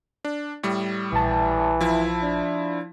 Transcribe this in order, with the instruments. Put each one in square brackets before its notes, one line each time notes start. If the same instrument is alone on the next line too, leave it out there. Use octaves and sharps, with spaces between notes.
[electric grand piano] D4
A2 G3
[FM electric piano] A#1 A5 [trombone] E3
[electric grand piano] F3 E4
[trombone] D4